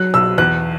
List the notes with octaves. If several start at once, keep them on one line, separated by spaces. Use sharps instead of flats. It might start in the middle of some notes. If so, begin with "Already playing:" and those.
Already playing: F#3 F#6
B1 E6
E2 F#6